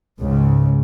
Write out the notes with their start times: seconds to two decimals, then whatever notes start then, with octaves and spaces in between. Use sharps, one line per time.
0.19 C#2 G#2 C#3